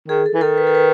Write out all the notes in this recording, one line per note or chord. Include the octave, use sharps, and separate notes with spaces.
D#3 G#4
A4
E3
D#3 A4
B4
A4
B4